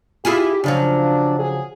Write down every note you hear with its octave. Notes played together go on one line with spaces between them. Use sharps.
E4 F4 G4 G#4
C#3 F3 F#3 D4
G#4